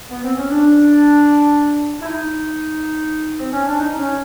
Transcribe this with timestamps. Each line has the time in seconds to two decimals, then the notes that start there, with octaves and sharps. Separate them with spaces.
0.10 B3
0.24 C4
0.36 C#4
0.50 D4
2.00 E4
2.05 D#4
3.39 C4
3.52 C#4
3.65 D4
3.78 D#4
3.98 C#4